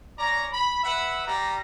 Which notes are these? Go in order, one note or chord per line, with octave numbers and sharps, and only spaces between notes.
C#4 D5 A#5
B5
B4 E5 F#5 B5
G3 A#5